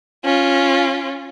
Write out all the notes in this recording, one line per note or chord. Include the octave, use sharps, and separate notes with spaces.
C#4 F4